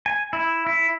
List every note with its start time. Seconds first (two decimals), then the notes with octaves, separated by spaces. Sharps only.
0.06 G#5
0.33 E4
0.67 E4